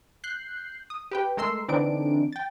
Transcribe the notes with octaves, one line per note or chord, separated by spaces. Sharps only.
F#6 G6 C7
D#6
G4 B4 G5
G#3 A3 A#4 C6 E6 C7
D3 E3 C4 D4 D#4 D7
G5 A6